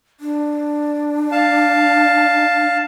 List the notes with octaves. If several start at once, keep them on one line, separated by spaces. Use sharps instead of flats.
D4
F5 A5